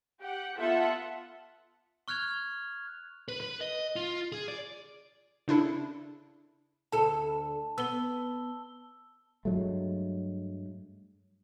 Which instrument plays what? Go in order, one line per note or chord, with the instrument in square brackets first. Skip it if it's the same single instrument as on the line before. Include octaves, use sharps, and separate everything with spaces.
[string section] G4 F#5
B3 F4 A4 E5 F#5
[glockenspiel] C#6 F6 F#6 G#6 F7
[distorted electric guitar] B4
B4
D#5
F4
G#4
D5
[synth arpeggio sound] C#3 D4 E4 A4
[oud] D2 A4 [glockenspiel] A5
[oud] B3 [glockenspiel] E6 G7
[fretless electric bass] G2 F#3 G#3 A3